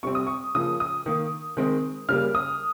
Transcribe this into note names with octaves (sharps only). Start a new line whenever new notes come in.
C3 G3 C4 C#6
D#6
C#6
C#3 F3 A#3 D#6
D#6
D#3 A#3
D#3 G#3 C4
C#3 G3 A#3 F6
D#6